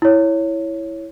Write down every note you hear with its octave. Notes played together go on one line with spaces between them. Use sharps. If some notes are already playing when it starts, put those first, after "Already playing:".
E4 C#5